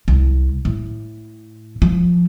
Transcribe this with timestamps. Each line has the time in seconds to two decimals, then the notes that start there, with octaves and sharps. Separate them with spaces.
0.08 C2
0.65 A2
1.82 F3